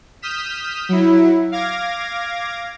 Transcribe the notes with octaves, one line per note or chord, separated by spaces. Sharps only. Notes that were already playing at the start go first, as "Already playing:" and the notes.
D#6 F6 G6 B6 E7
F#3 E4
F5 D6 G#6 A#6